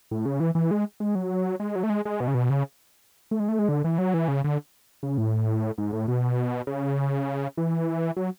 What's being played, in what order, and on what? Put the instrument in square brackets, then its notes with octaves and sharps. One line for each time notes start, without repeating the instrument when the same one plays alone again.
[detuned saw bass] A2
C#3
E3
E3
G#3
G#3
F#3
G#3
F#3
A3
G#3
G#3
B2
C#3
B2
C#3
A3
G#3
A3
G#3
D3
E3
F#3
E3
C#3
D3
C#3
A2
G#2
A2
B2
C#3
E3
F#3